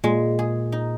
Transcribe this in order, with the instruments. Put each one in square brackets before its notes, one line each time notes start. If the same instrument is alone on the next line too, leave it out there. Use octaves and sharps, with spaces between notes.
[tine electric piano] A#2 [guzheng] G#3
[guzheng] G#4
D#4